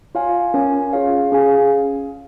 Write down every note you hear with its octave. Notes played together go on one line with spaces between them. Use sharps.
F4 C#5 F5 G#5
C#4 A#4 C#5 G#5
F4 G#4 C#5 F5
C#4 G#4 F5 G#5